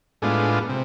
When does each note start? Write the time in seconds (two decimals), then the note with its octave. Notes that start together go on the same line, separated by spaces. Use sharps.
0.22 A2 G#3 B3 D4 F4
0.69 C3